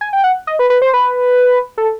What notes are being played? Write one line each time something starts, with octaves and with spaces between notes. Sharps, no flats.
G#5
G5
F#5
D#5
B4
B4
C5
B4
A4